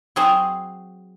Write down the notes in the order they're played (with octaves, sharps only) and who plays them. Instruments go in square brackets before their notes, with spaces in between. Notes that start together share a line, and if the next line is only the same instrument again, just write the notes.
[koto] F#3 C4 G#4 C5